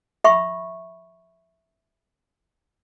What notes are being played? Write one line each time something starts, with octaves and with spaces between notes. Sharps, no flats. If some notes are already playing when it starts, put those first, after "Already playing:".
E5 B5 C#6